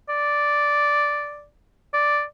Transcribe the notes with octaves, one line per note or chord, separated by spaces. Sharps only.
D5
D5